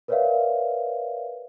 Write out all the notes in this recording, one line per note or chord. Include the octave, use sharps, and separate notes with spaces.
A#4 B4 C#5 D5 E5 F5